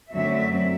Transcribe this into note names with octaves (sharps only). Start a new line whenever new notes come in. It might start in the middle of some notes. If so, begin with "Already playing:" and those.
F#2 D3 F#3 A3 C4 E5